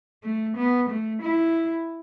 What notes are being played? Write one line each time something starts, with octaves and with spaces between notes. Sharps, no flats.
A3
B3
A3
E4